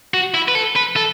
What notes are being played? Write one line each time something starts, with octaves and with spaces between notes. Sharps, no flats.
F#4
E4
B4
A4
B4
A4